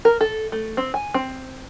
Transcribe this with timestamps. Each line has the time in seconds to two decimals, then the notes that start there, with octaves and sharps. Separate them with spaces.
0.05 A#4
0.21 A4
0.52 A3
0.77 C4
0.94 G#5
1.14 C4